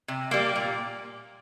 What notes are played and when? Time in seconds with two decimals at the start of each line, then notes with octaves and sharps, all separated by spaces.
0.08 C3
0.31 G3 A#3
0.55 A#2